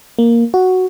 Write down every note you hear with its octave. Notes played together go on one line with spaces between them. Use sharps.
A#3
F#4